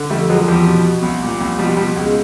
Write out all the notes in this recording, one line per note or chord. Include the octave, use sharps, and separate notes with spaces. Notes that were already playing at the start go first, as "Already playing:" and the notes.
Already playing: D3
F2 G3 A3
F3 F#3 G#3
E2 F3 G3
B2
B2
C2
A#2
C2
B2 F3 G3
B2 F3 G3
C#2
G#3